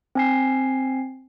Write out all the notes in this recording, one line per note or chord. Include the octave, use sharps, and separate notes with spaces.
C4 G#5 C7